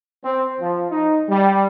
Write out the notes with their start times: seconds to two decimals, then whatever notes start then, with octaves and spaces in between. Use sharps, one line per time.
0.24 C4
0.60 F3
0.90 D#4
1.28 G3